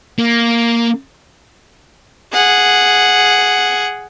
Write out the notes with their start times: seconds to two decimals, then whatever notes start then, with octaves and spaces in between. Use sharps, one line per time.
0.19 A#3
2.33 G#4 F#5